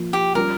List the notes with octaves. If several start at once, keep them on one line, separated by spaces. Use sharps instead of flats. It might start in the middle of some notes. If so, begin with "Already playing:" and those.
Already playing: F3 A#3 F4
G4
G3 C#4 F4 A#4